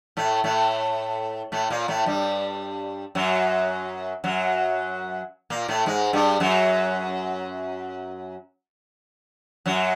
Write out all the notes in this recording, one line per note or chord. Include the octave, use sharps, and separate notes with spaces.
A2 A3
A2 A3
A2 A3
A#2 A#3
A2 A3
G2 G3
F#2 F#3
F#2 F#3
A#2 A#3
A2 A3
G#2 G#3
G2 G3
F#2 F#3
F#2 F#3